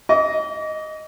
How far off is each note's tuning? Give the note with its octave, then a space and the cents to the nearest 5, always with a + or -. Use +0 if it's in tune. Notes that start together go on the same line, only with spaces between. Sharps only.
D#5 +0 D6 -40